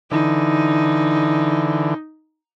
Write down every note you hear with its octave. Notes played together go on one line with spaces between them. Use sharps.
D3 E3 D#4